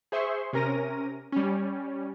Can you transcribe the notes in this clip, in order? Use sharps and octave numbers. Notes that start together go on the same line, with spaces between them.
G#4 C5 E5 C6 C#6
C3 C#4 A#4 A#6 D#7
G3 C#4